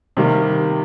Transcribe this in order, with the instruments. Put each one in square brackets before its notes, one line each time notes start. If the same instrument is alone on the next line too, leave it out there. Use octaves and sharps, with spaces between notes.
[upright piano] C3 D#3 G3 A#3